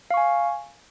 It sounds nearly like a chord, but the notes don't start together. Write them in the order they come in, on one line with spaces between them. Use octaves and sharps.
F5 C#6 G#5